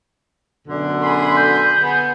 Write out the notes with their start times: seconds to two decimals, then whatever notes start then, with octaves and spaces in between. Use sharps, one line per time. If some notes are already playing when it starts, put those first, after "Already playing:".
0.68 F#2 B2 D3
1.02 G#4 B5 C6
1.37 G6
1.81 B3 G#4